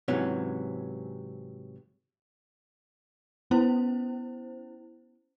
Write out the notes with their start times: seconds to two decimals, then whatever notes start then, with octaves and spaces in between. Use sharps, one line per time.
0.08 G#2 C3 E3 F#3 C#4
3.51 B3 C#4 E4 C5